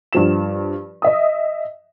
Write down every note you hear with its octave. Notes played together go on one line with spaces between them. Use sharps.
G2 F3 E7
D#5 E5 D#6